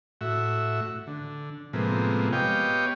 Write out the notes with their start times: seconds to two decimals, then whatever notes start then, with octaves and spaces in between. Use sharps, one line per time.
0.21 A2 F#4 E5
1.07 D3
1.73 A2 C3 F3 G#3 A#3 B3
2.33 B3 G4 C#5 D#5 F5 G5